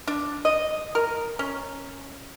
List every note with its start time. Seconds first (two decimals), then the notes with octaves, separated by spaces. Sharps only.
0.07 D4
0.45 D#5
0.95 A#4
1.39 C#4